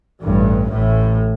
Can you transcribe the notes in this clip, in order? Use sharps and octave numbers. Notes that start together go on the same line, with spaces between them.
A1 G2
A1 A2